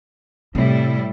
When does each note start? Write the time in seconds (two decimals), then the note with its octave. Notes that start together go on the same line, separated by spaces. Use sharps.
0.55 A2 C3 G3 E4